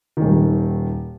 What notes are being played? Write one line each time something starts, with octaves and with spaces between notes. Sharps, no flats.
D#1 D#3